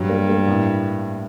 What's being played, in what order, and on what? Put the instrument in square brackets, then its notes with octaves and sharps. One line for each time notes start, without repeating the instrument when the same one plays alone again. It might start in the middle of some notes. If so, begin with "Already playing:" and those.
Already playing: [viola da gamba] G2 [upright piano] F#3 G3
[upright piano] A#3
A#3
A2